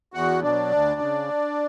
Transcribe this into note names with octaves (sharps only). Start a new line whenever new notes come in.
E2 F#4 F#5
B2 F#3 D4 D5
D2
C#3